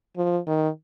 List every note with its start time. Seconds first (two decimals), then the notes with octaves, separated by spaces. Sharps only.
0.17 F3
0.47 D#3